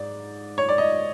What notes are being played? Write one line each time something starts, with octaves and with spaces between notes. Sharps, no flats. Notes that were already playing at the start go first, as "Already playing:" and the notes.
Already playing: G#2 D5
C#5
D5
D#5